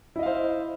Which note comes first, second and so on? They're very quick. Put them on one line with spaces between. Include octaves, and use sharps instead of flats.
E4 D#5 F5 C5